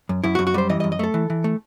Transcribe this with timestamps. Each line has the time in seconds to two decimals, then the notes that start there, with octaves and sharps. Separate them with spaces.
0.09 F#2
0.24 F#2 E4
0.35 F#4
0.39 F#2
0.47 F#4
0.54 G3 C5
0.69 E3 D#5
0.80 D#5
0.84 F#2
0.92 D#5
0.99 A3 A4
1.14 E3
1.30 E3
1.44 A3